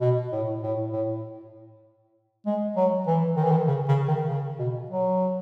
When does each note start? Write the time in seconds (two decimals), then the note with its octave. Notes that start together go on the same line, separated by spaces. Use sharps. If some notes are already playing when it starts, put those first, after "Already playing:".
0.01 B2
0.32 A2
0.63 A2
0.93 A2
2.46 G#3
2.76 F#3
3.07 E3
3.36 D#3
3.44 E3
3.51 D#3
3.67 C#3
3.88 C#3
4.08 D#3
4.28 C#3
4.59 B2
4.90 F#3